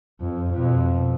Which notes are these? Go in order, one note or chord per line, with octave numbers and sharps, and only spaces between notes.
F2
F2 B2